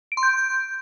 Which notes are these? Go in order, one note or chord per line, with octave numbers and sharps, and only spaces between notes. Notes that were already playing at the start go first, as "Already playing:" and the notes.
D7
C6
G6